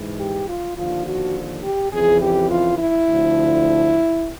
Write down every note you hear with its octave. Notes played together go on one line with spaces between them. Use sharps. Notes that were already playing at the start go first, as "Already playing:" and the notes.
Already playing: G#2 E3
G4
F4
D#2 D3 F3 F4
F#4
G4
F2 C#3 E3 G#4
G4
F4
E4
D2 D3 F3